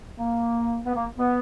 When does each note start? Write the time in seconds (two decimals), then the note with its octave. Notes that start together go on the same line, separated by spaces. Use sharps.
0.19 A#3
0.85 B3
0.95 A#3
1.17 B3